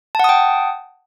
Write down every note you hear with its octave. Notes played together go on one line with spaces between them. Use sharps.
F#5 G5 A5 D#6